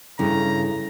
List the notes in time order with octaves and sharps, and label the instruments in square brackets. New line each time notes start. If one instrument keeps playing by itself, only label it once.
[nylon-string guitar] G2 [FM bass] C#3 [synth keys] C#4 E4 A4 [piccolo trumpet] A#5